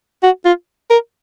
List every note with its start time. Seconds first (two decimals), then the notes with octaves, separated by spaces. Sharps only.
0.23 F#4
0.45 F4
0.90 A#4